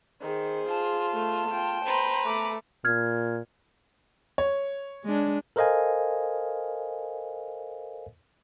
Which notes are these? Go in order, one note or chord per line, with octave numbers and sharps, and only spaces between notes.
D#3 G#4 C5
F4 A5
A3
F4 G5
B4 C5 A#5
A3 D6
A#2 F6 G#6
C#5
G#3 D4
A4 A#4 C5 D#5 F5 G#5